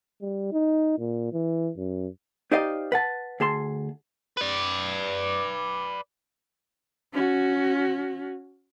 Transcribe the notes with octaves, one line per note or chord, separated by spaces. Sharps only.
G3
D#4
A#2
E3
F#2
D#4 G4 C5 D5 D#5 F5
B4 F#5 A5
D2 G#4 A5 C6
B4 D5
C#4 F#4